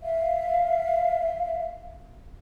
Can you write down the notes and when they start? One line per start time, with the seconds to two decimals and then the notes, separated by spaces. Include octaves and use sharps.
0.02 E5 F5